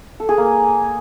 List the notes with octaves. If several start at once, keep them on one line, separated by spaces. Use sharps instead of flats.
A4
G#4
A#3